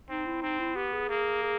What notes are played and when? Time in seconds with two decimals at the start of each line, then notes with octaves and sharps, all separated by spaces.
0.09 C4 D#4
0.26 E4
0.42 C4 D#4
0.59 E4
0.76 B3 G4
0.93 G#4
1.09 A#3 G#4
1.43 G#4